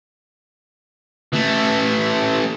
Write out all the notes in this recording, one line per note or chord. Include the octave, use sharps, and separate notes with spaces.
E3 A3